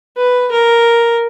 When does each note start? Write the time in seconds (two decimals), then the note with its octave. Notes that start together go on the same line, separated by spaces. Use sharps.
0.17 B4
0.52 A#4